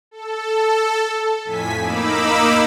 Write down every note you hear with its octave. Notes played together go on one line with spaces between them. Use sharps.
A4
F2 A2 G#5 B6
A#3 D#4 B5 D6 E6